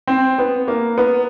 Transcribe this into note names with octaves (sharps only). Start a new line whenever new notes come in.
C4
B3
A#3
B3